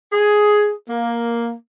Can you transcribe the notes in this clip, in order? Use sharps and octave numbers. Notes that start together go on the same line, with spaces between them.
G#4
A#3